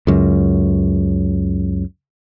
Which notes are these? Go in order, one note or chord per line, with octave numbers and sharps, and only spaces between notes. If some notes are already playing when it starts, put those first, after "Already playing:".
C#2 F#2